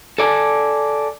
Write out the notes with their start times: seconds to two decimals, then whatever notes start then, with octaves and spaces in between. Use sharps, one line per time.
0.18 A4 D5 G#5 A5